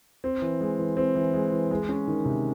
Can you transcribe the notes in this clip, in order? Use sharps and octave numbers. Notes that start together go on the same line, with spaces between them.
C4
E3
G#3
E3
C4
E3
G#3
E3
G#3
C#4
D#3
C3